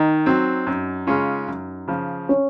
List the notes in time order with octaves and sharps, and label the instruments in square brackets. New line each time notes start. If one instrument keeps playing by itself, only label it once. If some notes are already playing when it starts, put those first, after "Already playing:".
Already playing: [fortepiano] D#3 [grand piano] D#4
[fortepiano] F#3 C4
F#2
C#3 G#3 C#4 F4
F#2
C#3 F3
[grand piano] C#4